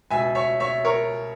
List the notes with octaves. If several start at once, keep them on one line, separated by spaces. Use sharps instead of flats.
C#2 B2 E5 G#5
C#5 E5
C#5 E5
A#4 C#5